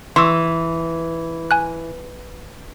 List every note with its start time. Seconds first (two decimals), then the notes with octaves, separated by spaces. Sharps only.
0.16 E3 C6 C#6 E6
1.51 G#5 F#6